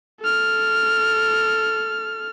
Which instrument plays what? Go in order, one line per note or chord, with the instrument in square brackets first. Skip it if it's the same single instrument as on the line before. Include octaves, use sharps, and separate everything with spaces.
[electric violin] A4 F6